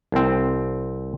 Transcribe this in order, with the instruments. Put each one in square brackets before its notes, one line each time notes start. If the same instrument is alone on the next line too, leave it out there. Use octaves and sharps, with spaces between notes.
[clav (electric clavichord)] C2 C4